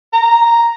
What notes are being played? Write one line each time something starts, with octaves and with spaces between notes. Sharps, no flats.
A#5